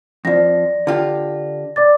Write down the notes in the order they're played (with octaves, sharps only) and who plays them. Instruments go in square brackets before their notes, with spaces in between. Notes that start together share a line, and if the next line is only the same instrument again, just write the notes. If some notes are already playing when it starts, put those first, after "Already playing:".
[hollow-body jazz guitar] F2 F3 [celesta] D5 A#6
[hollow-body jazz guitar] D3 F4 G4
[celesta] D5 D6 A6